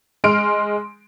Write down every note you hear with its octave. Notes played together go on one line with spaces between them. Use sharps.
G#3 C6 F6 D7